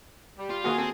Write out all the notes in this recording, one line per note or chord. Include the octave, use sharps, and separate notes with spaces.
G3
F4
D#3 A#3 F#4 G#4
C4 A4